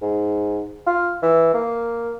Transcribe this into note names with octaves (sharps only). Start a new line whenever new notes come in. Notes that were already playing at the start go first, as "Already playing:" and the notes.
G#2
F4
E3
A#3